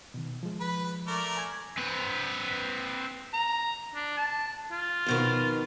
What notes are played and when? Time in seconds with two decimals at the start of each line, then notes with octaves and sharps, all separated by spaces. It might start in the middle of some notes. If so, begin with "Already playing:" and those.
0.14 B2 D#3
0.43 F3 G#3
0.60 B4 B5
1.07 A3 A#4 D5
1.37 G#5 A#5 G#6
1.77 C4 B4
3.33 A#5
3.95 D4
4.17 A5
4.71 F4
5.06 F2 B2 D#3